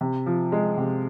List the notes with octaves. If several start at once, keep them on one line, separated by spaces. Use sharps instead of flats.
C3
F3
G#3
C3